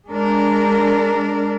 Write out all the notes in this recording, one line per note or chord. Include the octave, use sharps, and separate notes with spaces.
G#3 D4 A#4